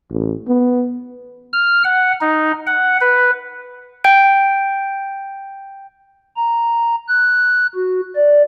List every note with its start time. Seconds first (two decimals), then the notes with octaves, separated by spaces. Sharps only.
0.10 A1
0.48 B3
1.53 F6
1.84 F#5
2.21 D#4
2.67 F#5
3.01 B4
4.04 G5 G6 D7
6.37 A#5
7.08 F#6
7.74 F#4
8.15 D5